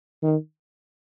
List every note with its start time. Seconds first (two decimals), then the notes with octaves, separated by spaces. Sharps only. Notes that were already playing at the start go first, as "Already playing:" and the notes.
0.23 D#3